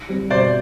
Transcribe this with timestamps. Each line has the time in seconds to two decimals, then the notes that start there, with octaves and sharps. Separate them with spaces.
0.09 G3 C4
0.30 B2 C5 D5